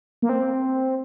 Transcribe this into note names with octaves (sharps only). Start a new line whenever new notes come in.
A#3
C4